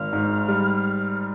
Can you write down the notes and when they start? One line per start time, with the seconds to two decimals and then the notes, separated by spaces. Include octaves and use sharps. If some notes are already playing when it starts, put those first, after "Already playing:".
Already playing: G#1 F6
0.13 G#2
0.48 G3